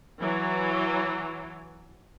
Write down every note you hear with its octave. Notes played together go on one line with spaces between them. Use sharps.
E3 F#3